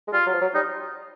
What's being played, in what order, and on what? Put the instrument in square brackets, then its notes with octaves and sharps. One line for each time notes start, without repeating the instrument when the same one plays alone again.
[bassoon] G#3
[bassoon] G3 [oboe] F4
[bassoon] F#3
F3
F#3
[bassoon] G3 [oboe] D#4